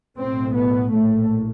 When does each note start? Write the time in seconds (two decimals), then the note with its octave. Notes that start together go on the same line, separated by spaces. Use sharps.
0.18 B1 A2 C4
0.55 B3
0.92 A#1 A2 A3